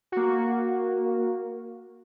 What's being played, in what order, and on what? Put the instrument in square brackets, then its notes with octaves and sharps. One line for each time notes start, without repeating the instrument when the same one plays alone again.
[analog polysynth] A#3 F#4